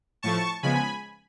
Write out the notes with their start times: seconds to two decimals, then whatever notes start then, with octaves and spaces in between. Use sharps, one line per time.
0.23 A2 F3 A3 A5 C#6
0.63 C#3 F3 G#3 B3 G#5 B5